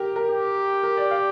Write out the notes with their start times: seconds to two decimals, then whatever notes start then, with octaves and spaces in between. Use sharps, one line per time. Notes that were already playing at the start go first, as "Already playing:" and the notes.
Already playing: G4 A#4
0.16 A#4
0.30 G4
0.83 A#4
0.97 D5
1.11 F5